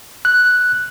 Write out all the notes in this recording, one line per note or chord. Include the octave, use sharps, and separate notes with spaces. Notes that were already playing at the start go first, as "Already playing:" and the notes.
F#6